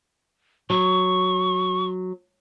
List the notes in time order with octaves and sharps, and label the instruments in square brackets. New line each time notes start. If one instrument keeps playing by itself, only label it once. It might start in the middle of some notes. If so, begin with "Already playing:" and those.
[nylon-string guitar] F#3 [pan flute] C#6